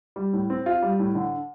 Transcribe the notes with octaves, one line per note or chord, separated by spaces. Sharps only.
G3
A2
C4
F4
G3
A2
D3